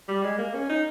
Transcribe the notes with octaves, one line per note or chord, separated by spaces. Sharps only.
G3
G#3
A#3
C#4
D#4